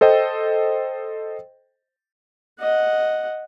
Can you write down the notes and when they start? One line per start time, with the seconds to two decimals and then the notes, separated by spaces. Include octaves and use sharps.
0.01 A4 C5 D#5 G5
2.60 D#5 F#5